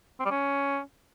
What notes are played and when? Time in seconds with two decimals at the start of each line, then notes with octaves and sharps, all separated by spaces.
0.20 C4
0.25 G3
0.31 C#4